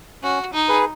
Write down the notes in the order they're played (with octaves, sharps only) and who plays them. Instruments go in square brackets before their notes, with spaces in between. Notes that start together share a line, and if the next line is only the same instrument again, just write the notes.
[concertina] C#4 [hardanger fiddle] F#4
[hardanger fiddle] D#4
[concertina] G#4 B4